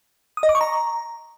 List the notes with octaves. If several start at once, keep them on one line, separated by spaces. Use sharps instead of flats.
D#6
D#5
D6
C#6
A#5